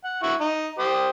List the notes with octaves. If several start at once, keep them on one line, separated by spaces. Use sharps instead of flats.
F#5
E4 F#5 C#6
D#4
G4 C5 D#6